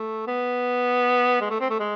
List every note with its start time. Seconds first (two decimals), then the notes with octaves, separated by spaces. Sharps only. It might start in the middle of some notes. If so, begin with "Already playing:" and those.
Already playing: A3
0.27 B3
1.41 G#3
1.50 A3
1.60 C4
1.70 A3
1.80 G#3